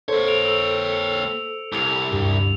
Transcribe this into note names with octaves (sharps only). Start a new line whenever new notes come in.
A#3 A4 C5 C#5
D7 F7
E6 F7
C#7
C2 D6 E6 F7
D2 G2 G4